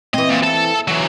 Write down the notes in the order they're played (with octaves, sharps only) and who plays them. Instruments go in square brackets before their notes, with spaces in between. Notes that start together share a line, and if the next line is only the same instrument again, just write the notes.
[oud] E3 C4 [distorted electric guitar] D#5
[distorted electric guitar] A#2
A4 A5
E3 F#3